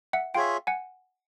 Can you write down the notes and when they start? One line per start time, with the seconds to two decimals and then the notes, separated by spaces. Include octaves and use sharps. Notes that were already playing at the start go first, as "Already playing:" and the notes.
0.13 E5 F#5
0.35 F4 G#4 C#5 E5 F5 G5
0.67 F#5 G#5